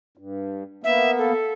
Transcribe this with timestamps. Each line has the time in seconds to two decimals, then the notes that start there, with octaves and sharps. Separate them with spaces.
0.17 G2
0.84 A#3 B3 E5
1.18 A4